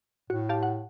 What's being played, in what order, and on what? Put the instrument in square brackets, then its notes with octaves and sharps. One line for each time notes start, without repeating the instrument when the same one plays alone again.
[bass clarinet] A2 [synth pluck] F#4
[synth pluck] G4 F5 A5
F#5